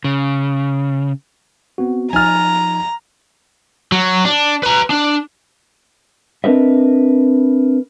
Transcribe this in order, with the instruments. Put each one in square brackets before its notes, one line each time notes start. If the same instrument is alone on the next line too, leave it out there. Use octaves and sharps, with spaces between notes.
[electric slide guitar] C#3
[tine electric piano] B3 C4 F#4
[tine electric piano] F3 D#4 A6 [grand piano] G#5 F6 [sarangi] A#5
[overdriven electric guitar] F#3
D4
B4 A#5
D4
[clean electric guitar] C4 D4 A#4 B4 D#5 E5